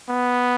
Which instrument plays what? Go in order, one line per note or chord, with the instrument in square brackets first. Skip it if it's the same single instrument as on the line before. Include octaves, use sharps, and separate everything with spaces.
[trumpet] B3